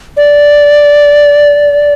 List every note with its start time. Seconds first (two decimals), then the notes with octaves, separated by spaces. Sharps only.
0.17 D5